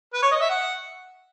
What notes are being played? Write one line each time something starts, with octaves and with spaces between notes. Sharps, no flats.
B4
C#5
D#5
E5
F#5